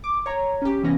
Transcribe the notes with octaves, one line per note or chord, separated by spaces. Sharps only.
D6
C#5 A#5
C#4 G4
C3 E3 B3 C#4 A#6